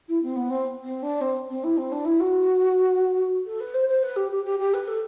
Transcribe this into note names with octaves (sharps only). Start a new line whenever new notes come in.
E4
C4
B3
C4
C4
D4
C4
C4
E4
C4
D4
E4
F#4
A4
B4
C5
C5
B4
G4
G4
G4
G4
B4
A4